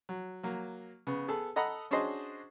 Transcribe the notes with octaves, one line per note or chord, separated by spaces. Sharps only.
F#3
F#3 A#3
C#3 B3
B3 G#4 A4 B4
A4 D#5 F#5 A#5 B5 D#6
C#4 D4 F#4 G#4 C5 D#5